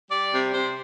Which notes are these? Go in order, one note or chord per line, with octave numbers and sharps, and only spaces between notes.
G3 D5
C3
C3 C5